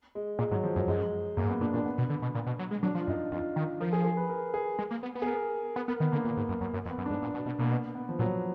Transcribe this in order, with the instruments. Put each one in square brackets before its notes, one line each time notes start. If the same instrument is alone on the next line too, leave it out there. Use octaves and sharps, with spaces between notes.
[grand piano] G#3
[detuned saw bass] A#2 [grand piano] G#3
[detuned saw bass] G#2 [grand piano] F#3
[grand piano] F3
[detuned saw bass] F#2 [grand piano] F#3
[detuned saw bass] F#2 [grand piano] G#3
[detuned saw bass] F#2 [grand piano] A#3
[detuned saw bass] G#2
[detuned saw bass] F#2 [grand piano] B3
[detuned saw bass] A#2 [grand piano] D4
[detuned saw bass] A#2 [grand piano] D4
[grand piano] B3
[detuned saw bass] B2
D3
B2
A#2
B2
F#3
G#3
[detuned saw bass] F#3 [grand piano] D4
[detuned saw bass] F3
[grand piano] F4
[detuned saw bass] F#2 [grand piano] D#4
[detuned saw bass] F2 [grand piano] F4
[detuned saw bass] D#3
[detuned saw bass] F3 [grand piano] A#4
[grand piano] G#4
G#4
B4
A#4
G#4
[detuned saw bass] G#3
A#3
B3
B3
[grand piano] G#4
A#4
[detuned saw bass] B3
[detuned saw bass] B3 [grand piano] A#4
[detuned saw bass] D#3 [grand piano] B3
[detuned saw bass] D3 [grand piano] A#3
[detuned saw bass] A#2
G#2
F#2
F#2
F#2
F2
[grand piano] B3
[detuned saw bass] F#2
[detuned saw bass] G#2 [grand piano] D4
[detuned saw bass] A#2
B2
B2
[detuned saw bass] B2 [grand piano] A#3
[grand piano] B3
B3
F3
[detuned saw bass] A#2 [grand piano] F#3